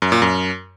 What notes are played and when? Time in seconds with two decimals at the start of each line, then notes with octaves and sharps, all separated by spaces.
0.02 F#2
0.12 A#2
0.22 F#2